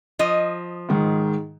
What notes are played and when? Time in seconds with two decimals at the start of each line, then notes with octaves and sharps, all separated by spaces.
0.19 F3 D#5
0.89 G#2 D#3 G#3